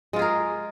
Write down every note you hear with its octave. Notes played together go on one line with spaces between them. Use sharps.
G#3 F4 G#4 A#4